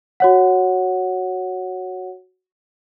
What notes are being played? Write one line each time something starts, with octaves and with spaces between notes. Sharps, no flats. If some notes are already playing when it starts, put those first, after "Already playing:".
F#4 C#5 F#5